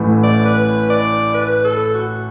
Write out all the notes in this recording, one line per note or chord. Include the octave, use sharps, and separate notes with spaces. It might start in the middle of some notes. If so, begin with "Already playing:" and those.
Already playing: A1 A2 E3 A3
D5
B4
D5
B4
A4
F#4